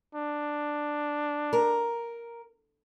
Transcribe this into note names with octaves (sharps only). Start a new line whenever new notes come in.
D4
A#4